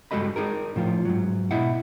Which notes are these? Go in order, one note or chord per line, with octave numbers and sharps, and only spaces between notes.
G2 G#3 F#4 A4 D#5 B5
D#4 G#4 A#4
A2 F3 F4
G#2 F#3
B2 E4 D#5 E5 F#5